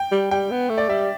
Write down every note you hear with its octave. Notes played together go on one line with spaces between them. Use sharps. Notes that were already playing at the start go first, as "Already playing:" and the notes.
Already playing: G5
G3
G3 G5
B3
A3
D5
G3 E5